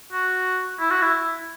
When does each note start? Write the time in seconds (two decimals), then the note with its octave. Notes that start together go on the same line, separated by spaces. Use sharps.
0.13 F#4
0.80 E4
0.90 F#4
1.02 E4